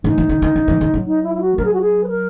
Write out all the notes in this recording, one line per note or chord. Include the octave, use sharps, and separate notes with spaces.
E3 D#4
E3
D#3
D#3
E3
E3
D#3
F#3
D#4
E4
E4
F#4
F#3 A#4
G#4
F#4
G#4
B4
A#4